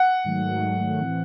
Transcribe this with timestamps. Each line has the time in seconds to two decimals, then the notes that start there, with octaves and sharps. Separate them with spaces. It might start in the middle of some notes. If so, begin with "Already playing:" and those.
Already playing: F#5
0.24 G#2 D#3 F#3 A3
1.01 A2 E3 C4